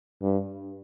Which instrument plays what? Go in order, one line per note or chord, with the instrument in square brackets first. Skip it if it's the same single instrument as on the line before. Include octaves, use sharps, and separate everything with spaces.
[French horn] G2